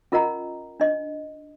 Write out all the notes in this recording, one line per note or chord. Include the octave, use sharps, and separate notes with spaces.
C#4 F4 A#4 D#5 F#5 A#5
D4 D#5